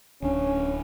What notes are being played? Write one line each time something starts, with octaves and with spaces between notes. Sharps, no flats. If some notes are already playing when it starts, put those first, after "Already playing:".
D1 C#4 D4